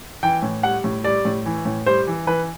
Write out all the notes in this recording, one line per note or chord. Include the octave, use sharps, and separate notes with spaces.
E3 G5
A2
G3 F#5
A2
G3 D5
A2
E3
A2
G3 C5
E3
E3 B4